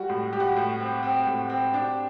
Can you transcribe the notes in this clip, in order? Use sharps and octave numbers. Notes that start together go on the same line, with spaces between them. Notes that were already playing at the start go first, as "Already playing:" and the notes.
Already playing: G3 F#4
A2
G3 G4
F#4
G4
A2
C4
C4
A2
C4
D4